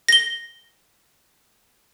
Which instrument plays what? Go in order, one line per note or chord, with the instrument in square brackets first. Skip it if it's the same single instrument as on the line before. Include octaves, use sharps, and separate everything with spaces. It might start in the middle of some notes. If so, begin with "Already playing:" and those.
[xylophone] A#6 G7